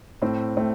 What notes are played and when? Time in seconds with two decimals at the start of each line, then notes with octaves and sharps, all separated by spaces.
0.22 A2 A3 C4
0.57 A2 A3 C4